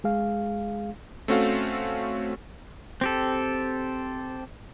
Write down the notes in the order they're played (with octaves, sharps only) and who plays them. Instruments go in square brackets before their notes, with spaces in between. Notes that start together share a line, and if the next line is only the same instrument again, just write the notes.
[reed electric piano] G#3 G#4 F5
[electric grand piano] A3 C4 C#4 F#4 A4 F5
[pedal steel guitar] C4 G4 A4